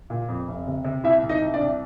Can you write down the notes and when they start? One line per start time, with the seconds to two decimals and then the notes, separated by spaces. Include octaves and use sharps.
0.10 A#2
0.28 F2
0.48 F1
0.67 C3
0.84 C3
1.04 C2 E4 E5
1.23 C2
1.29 D#4 D#5
1.42 C2
1.54 D4 D5
1.60 C2